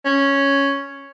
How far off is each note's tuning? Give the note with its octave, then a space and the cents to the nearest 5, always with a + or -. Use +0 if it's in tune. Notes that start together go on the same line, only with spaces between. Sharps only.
C#4 +0